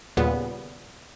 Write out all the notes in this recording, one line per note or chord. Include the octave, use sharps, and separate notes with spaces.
D#2 A#2 C#3 G3 B3 B4